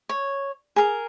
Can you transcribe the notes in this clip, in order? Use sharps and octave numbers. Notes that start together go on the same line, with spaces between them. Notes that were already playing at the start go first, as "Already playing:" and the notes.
C#5
G#4 A#4